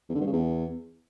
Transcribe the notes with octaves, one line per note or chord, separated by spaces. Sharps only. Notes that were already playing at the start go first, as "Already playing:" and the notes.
E2
D3
G2
C#3
E2